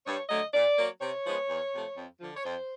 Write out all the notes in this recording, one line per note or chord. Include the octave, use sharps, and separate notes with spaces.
G2 C#5
D3 F#3 A3 D#5
A#2 D5
F#3 A#3
C3 C#5
F3 G#3 B3
E2
C3 F3 A3
F2
D3 F3
C#5
F2 C5